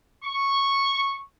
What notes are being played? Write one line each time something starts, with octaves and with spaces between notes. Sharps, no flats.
C#6